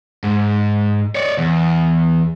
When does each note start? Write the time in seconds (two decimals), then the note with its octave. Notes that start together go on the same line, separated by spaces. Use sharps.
0.24 G#2
1.15 C#5 D5
1.38 E2